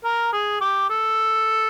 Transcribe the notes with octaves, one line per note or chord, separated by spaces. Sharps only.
A#4
G#4
G4
A4